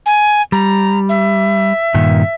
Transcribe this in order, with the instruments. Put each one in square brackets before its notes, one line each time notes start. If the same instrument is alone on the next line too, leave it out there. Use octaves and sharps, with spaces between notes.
[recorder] G#5
[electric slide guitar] G3 [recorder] A#5
[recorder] E5
[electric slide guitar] G2 A#2 D#3